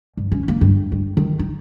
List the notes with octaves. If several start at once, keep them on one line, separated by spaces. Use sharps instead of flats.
G2
C#4
A#3
G2
G2
D#3
D#4